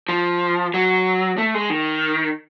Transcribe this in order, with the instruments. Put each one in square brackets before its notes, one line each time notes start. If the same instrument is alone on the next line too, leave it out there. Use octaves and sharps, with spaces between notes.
[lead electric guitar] F3
F#3
A3
G#3
D#3